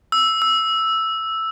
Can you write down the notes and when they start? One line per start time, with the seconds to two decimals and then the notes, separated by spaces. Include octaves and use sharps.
0.12 E6
0.42 E6